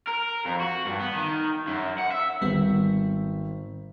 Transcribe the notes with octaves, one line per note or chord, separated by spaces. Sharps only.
A#4
F2
F#4
G2
B3
D#3
F#2
F#5
E5
G#1 G3 B3 B6